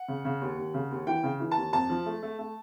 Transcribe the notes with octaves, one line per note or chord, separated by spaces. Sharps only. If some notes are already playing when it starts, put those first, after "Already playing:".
Already playing: F#5
C#3
C#3
D#2
D#2
C#3
D#2
E3 G5
C#3
E3
A5
D#2
F2 A5
F3
A3
A3
A3